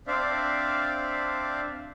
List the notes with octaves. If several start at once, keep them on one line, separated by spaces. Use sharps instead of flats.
C4 D4 C5 D5 E5 F5